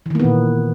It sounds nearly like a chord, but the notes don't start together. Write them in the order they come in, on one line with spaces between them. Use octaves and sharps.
E3 D#3 A#3 B3 A#2